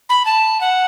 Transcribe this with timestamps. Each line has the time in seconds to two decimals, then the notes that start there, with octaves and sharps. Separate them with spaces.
0.09 B5
0.25 A5
0.61 F#5